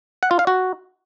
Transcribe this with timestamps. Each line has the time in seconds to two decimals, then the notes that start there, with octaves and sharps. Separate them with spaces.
0.23 F#5
0.31 F4
0.39 F5
0.47 F#4